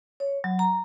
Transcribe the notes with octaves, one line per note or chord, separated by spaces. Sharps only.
C#5
F#3
A#5